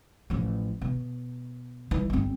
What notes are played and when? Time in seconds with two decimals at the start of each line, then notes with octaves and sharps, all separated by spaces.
0.30 A1 F3
0.81 B2
1.91 E3 G3
2.10 G1 C4